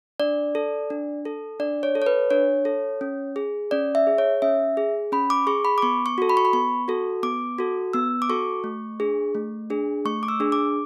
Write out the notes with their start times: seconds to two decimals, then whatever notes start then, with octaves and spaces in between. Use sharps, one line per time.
0.20 D4 D5
0.55 A4
0.90 D4
1.25 A4
1.60 D4 D5
1.83 C#5
1.95 A4
2.02 C#5
2.06 B4
2.31 D4 C#5
2.65 A4
3.01 C#4
3.36 G#4
3.71 C#4 D5
3.95 E5
4.07 G#4
4.18 C#5
4.42 C#4 E5
4.77 G#4
5.12 C#4 B5
5.30 D6
5.47 G#4 C#6
5.65 B5
5.78 D6
5.82 B3 C#6
6.06 C#6
6.18 F#4 A4
6.29 B5
6.37 C#6
6.45 B5
6.53 B3 C#6
6.88 F#4 A4
7.23 B3 D6
7.58 F#4 A4
7.93 B3 E6
8.22 D6
8.29 F#4 A4 C#6
8.64 A3
9.00 D4 G#4
9.35 A3
9.70 D4 G#4
10.05 A3 C#6
10.23 D6
10.28 E6
10.40 D4 G#4
10.52 D6